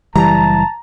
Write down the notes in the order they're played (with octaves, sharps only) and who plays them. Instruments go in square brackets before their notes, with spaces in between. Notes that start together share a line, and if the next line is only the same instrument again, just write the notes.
[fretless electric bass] F#1 E3 G3 [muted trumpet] A5 [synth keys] A#5